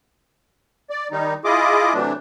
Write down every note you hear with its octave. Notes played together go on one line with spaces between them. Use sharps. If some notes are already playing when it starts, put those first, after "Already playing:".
D5
D#3 G3 D#4
E4 F4 G#4 D#5 D6
C3 E3 F#3 A3 D4